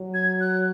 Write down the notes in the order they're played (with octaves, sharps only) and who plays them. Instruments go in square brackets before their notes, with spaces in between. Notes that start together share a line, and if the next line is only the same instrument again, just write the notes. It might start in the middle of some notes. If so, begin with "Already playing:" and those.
Already playing: [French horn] F#3
[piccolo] G#6
F#6